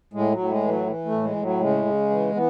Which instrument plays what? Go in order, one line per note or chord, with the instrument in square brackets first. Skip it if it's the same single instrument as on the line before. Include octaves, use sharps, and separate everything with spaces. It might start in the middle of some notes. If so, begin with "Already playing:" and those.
[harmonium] A2 G#3
F#3
A2
G#3
E3
F#3
E3
A3
A2
G#3
A2
F#3
C#3 G#3
C#3
E3
E3 B3